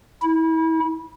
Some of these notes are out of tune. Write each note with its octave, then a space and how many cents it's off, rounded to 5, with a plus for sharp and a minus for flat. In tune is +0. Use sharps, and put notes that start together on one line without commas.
E4 -30